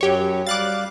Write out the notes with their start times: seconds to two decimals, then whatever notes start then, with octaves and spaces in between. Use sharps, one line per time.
0.01 F#2 F#3 G4 C#5
0.47 G3 F5 D6 F#6 A6